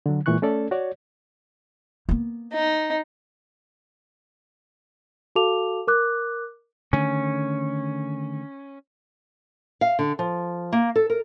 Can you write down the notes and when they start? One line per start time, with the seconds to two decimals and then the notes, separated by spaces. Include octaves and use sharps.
0.06 D3 F#3
0.26 A#2 E3 G#3 C#6 F#6
0.42 A3 C#4 A4 D5
0.71 F#4 C#5 D5
2.09 A#3 B3
2.53 D#4
5.36 F#4 A4 F5 A5 D6 F7
5.87 A#4 D6 F#6
6.93 D3 D#3 A3 C#4
9.81 F5
9.99 D3
10.19 F3
10.73 A#3
10.96 A4
11.10 A#4